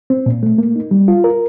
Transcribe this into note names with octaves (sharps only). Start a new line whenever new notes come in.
C4
A#2
A3
A#3
D#4
G3
F4
A#4